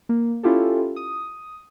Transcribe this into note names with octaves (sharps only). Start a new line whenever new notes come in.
A#3
C#4 E4 F4 G4 A4
D#6